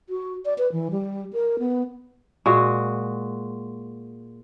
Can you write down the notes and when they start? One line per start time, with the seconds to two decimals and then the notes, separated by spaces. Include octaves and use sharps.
0.10 F#4
0.45 D5
0.58 B4
0.72 E3
0.91 G3
1.33 A#4
1.59 B3
2.46 A#2 G#3 F#4